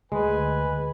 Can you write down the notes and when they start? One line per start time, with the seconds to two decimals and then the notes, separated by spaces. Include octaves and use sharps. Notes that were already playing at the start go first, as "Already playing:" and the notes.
0.12 D2 G#3 B4 G#5